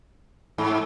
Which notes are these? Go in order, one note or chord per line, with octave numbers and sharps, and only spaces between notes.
G#2